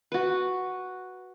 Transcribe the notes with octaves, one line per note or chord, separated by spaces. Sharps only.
F#4 B4